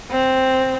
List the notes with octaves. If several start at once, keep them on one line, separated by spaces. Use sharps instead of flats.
C4